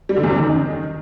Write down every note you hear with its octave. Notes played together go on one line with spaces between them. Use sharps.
G3
D3
E2
F#2
D#3